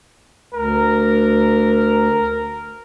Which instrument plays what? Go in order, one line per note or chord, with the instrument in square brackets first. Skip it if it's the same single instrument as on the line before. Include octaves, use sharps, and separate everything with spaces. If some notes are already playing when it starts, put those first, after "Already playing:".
[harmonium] D2 [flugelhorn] A#4